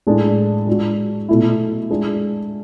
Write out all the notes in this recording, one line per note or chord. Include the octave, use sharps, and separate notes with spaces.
A2 G#3 D4 G#4
G#3 D4 F#4
B2 A3 E4
G#3 D4 G#4